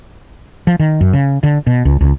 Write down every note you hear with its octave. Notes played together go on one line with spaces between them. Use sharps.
F3
D#3
F#2
C#3
D3
B2
C#2
C#2